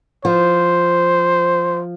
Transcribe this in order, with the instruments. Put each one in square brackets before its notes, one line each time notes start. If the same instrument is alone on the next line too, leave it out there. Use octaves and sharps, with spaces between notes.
[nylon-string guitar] F3 [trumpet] C5